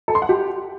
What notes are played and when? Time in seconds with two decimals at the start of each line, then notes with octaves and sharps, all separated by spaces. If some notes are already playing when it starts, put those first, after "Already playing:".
0.08 A4
0.15 C6
0.22 F#5
0.29 G4